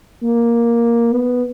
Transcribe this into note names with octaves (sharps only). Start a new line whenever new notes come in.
A#3
B3